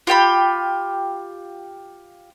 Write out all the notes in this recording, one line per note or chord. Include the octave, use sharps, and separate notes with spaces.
F4 G4 G5 B5